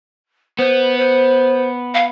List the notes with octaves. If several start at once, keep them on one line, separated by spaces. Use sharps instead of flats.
B3 C5
C5
F5